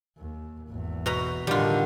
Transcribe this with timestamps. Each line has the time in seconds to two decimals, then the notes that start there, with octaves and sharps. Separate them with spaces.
0.18 D#2
0.68 G#1 E2
1.06 B2 B4 A#5
1.47 A2 D3 D#3 G3 F4